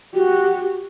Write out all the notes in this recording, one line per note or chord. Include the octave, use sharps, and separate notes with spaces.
F#4 G4